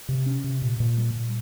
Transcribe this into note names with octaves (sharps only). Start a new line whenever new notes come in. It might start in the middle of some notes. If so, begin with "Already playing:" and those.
C3
C#4
C3
A#2
A#2
G3
A#2